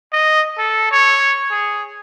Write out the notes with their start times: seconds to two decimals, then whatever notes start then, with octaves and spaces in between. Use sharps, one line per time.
0.13 D#5
0.58 A4
0.91 C#5
1.51 G#4